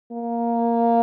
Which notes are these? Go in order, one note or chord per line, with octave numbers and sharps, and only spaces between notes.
A#3